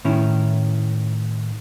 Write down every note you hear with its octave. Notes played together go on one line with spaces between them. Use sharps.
A2 D#3 C#4 E4